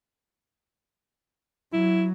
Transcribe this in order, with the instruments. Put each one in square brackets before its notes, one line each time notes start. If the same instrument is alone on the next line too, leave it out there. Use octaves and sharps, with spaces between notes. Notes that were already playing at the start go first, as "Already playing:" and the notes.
[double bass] F#3 [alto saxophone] E4